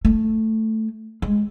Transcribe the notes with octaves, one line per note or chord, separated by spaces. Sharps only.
A3
G#3